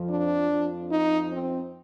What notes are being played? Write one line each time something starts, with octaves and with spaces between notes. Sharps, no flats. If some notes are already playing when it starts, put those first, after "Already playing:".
Already playing: F2 F3
D4
F2 F3
D#4
C4